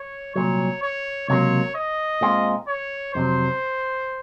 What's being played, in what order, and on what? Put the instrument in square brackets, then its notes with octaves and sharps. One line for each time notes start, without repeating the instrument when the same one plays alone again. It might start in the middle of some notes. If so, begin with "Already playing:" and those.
Already playing: [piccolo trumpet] C#5
[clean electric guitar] C2 A#2 F#3 [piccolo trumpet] C#5
[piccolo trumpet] C#5
[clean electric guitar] C#2 C3 F#3 A#3 [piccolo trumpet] C#5
[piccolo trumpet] D#5
[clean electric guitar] A#2 G#3 C4 F4
[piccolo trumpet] C#5
[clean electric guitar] F2 C3 F#3 [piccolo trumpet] C5